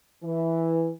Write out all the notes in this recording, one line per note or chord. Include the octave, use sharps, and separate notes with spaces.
E3